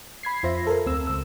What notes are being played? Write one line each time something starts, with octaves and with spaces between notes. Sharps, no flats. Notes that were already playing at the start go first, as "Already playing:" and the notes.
B5 G#6 C7
F2 F4 C5 E5 A#6
A4 A#4
D2 C4 E6
C#2 E6